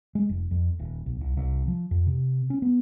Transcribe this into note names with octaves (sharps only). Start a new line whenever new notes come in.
G#3
F1
F2
D#1
B1
C2
C2
F3
F2
C3
C#4
B3